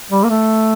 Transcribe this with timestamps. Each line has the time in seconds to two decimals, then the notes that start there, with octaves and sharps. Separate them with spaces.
0.11 G3
0.23 A#3
0.30 A3